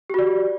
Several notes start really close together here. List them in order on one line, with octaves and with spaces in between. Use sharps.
G4 F#4 D5